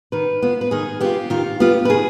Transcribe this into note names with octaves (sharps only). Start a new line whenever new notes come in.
D#3 B4
B3 F4
B4
D#3 G#4
B3 F4 G4
D#3 F4
B3 F4 G4
B4
D#3 G#4